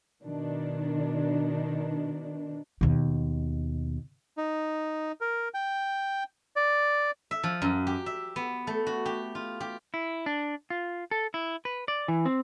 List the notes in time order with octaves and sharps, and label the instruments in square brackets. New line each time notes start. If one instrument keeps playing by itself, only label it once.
[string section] B2 D#3 D4
[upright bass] D#2 B2
[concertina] D#4
A#4
G5
D5
[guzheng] E5
F3
F#2
G4
E5
B3
A3
F#4
G4
F4
G4
[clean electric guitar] E4
D4
F4
A4
E4
B4
D5
E3
C4